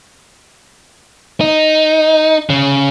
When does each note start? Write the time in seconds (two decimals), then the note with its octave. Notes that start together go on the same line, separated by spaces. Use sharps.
1.41 D#4
2.50 C#3